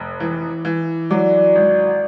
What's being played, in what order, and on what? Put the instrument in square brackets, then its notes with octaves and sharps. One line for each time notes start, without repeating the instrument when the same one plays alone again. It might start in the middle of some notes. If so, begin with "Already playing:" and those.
Already playing: [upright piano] F1
E3
E3
[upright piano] F#3 [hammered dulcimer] D5
[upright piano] G#1